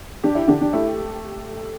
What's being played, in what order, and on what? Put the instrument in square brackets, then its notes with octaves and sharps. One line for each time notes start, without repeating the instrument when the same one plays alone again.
[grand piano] D4 [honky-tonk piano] G4
[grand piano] E4
[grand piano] D3 D4 [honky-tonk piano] G4
[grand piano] D4
[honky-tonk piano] A3 [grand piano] E4